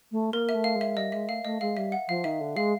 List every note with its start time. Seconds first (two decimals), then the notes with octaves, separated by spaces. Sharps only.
0.11 A3
0.33 A#3 A#4
0.49 E5
0.54 A3
0.64 F5
0.75 G#3
0.81 E5
0.97 G3 D#5
1.12 G#3 E5
1.29 A3 F5
1.44 A3 D#5
1.61 G#3 F5
1.77 G3 E5
1.92 F#5
2.08 F3 F5
2.24 D#3 E5
2.41 D3
2.56 G#3 F5